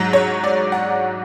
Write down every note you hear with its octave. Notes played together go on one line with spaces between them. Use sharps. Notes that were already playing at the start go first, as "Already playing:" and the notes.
Already playing: G#2 F#3
C#5
D5
F#5